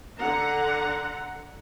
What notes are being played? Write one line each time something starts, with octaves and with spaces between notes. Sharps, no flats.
D3 F#5 A#5